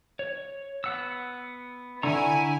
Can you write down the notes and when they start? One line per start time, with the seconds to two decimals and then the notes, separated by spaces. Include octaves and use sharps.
0.19 C#5
0.84 B3 F#5 E6
2.03 D3 E4 G#5 A#5 C#6 E6